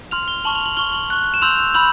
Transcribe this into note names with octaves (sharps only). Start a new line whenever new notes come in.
C6 F6 F7
G7
A5 C#6 F6 F#7
F7
F#7
C#6 F6 G7
F#7
C#6 F#6
E7
C6 E6 G6 F7
B5 E6 G6 F#7